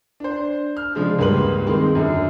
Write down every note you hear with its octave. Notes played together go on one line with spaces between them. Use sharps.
D4 C5
F6
C#3 F3 G#3 D4
C#2 G2 A#3 B4 C6 F#7
D#3 G#3 A#3 C4 D#4
F#2 D3